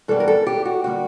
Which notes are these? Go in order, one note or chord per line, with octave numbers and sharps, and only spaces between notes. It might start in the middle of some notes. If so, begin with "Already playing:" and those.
G2 E3 G3 B3 A4
A#4
A4
G4
F#4
D3 G3 A#3 F#4